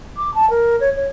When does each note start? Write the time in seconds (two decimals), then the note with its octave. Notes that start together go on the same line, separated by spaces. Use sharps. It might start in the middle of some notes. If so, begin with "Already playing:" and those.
0.17 D6
0.34 A5
0.50 A#4
0.80 C#5
0.96 C#5